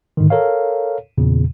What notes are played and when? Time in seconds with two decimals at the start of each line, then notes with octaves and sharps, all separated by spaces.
0.17 G#2 D3 D#3
0.30 A4 A#4 C#5 F5
1.18 E2 A#2 C#3